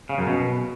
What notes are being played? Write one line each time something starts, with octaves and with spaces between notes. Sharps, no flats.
C#3
F#2
B2